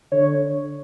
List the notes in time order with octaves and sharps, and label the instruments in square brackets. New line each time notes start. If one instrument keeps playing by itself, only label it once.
[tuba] D3 [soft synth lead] C#5